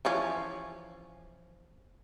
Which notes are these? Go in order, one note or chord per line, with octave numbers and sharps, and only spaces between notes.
E3 F3 C#4